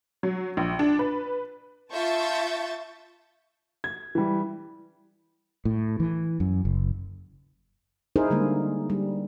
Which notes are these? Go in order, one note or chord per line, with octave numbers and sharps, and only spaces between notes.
F#3
A#1
D4
B4
F4 E5 A5 C#6 G6 A6
G#6
E3 G3
A2
E3
F#2
F#1
D#4 E4 G#4 A#4 C5
D3 G3 G#3 A#3
G3